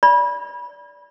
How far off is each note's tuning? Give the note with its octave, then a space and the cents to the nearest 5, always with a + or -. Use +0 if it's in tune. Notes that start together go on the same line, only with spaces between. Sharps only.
D5 -20 B5 -25